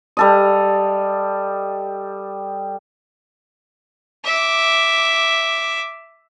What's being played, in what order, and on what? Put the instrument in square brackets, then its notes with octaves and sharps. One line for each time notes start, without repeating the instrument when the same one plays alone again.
[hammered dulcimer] G3 A4 D#5
[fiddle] E5 D6